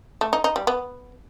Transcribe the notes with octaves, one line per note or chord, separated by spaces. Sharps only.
A3
D#4
D#4
G3
B3